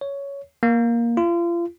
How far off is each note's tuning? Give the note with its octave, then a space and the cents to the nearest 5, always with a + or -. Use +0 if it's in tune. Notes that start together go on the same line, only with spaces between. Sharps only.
C#5 +10
A#3 +10
F4 -35